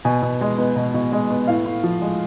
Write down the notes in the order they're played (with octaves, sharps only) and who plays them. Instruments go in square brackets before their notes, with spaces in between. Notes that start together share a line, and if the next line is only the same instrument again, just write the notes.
[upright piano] B2 G#5
B2
G#3
B3
B2
B2
G#3
B3
A2 F5
A2
F3
G#3